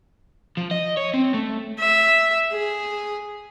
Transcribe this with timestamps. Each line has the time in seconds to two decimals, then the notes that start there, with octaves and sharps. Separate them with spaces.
0.57 F3
0.71 D#5
0.97 C#5
1.14 C4
1.34 A3
1.79 E5
2.52 G#4